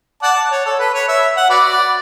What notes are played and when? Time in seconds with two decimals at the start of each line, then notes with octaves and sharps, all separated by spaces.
0.23 D5 F#5 A5
0.51 C#5
0.66 A4
0.79 B4
0.94 C#5
1.08 E5
1.37 F#5
1.50 F#4 B4 D5